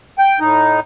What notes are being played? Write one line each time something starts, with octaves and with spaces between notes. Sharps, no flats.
G5
A2 D#4